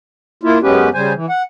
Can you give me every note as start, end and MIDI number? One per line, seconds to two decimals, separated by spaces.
0.43 0.58 58
0.43 0.58 64
0.43 0.58 65
0.62 0.89 42
0.62 0.89 56
0.62 0.89 59
0.62 0.89 61
0.62 0.89 67
0.62 0.89 71
0.94 1.13 49
0.94 1.13 55
0.94 1.13 72
0.94 1.13 80
1.14 1.26 52
1.29 1.42 78